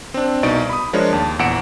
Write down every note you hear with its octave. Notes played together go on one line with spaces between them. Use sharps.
C4 D4
C2 B2 D#4 D5 C#6 D7
B5 D#6
F3 G#3 D4 A#4 C#5
D#2 A5
A#1 E2 F#5 C#7 D7 E7